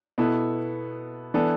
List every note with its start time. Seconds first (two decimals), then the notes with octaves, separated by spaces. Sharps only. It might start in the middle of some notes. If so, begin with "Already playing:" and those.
0.18 B2 B3 E4 A4
1.34 E3 B3 D4 A4